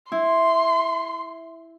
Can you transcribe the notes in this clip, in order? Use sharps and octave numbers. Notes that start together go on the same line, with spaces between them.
E4 C6